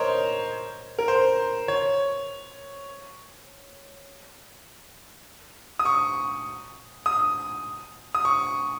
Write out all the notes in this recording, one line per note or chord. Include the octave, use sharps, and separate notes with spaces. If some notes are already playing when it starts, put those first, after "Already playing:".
Already playing: A#4 C5 C#5 D#5
A#4
C5
C#5
D#6
C#6
D#6
D#6
C#6